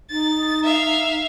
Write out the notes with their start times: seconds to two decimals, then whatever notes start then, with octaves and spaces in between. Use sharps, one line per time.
0.11 D#4 A6
0.64 E5 F5